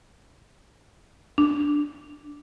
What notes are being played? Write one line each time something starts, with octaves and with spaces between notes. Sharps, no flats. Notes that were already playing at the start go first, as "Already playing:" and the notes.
D4